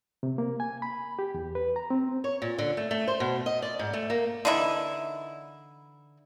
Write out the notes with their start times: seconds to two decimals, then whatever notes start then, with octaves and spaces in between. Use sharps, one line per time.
0.23 C3
0.38 A#3
0.60 G#5
0.82 B5
1.19 G4
1.34 E2
1.55 B4
1.76 A#5
1.90 C4
2.24 C#5
2.42 A#2
2.58 D3
2.77 A3
2.91 A3
3.07 C5
3.20 B2
3.46 D#5
3.62 D5
3.79 G#2
3.93 A3
4.10 A#3
4.45 D3 E3 D#4 E4